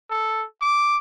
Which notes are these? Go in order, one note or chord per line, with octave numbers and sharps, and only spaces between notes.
A4
D6